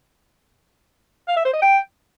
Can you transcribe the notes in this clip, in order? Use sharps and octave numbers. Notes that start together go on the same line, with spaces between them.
F5
E5
C5
D#5
G5